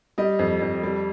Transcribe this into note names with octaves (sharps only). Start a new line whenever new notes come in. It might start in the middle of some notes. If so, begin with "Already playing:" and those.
G3 D#5
F2
F2
G3